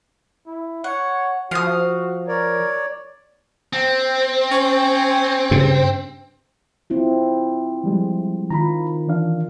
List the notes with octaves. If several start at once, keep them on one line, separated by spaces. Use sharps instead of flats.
E4
C#5 F#5
F3 F#4 F5 D#6
A#4 C#5 D5
C4
C#4
G2 C#3
C4 E4 F4
F3 G3 G#3
D#3 F4 A#5 B5
E3 D4 F5